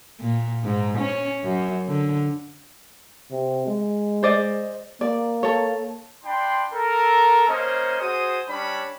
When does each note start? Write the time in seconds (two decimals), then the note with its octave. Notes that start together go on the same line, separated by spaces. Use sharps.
0.21 A#2
0.64 G#2
0.99 C#4
1.44 F#2
1.88 D3
3.31 C3
3.67 G#3
4.23 C5 D5 D#5
5.01 A#3 D5
5.43 A4 C#5
6.24 D4 G5 B5 C6
6.74 A4 A#4
7.49 A#3 C#4 C5 D#5
8.00 F#4 G#4 C5 D#6
8.49 G3 C#4 D4 C#5 B5